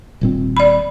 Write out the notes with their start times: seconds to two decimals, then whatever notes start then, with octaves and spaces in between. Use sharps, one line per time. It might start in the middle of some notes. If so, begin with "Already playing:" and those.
0.21 D#1 A#2 C4
0.57 D5 B5